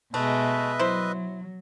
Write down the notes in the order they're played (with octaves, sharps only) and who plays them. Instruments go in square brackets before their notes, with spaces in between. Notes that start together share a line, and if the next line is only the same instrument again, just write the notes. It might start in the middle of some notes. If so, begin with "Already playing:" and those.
[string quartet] B2 G#3 [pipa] A3 [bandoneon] B4 D#5 E5
[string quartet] F#3 [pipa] E4 C5